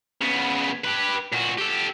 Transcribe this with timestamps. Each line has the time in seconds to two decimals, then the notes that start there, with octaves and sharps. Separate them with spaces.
0.22 C#3 B3
0.85 G4 B4
1.33 A#2 F#4
1.58 G4 A4